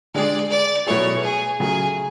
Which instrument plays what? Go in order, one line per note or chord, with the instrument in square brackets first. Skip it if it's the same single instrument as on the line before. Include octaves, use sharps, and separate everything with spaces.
[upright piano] D3 G#3 D4 G#4 [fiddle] D5
[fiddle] D5
[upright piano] B2 F#3 A3 E4 G#4 [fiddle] C#5
[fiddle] G#4
[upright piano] C#3 F#3 A3 [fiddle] G#4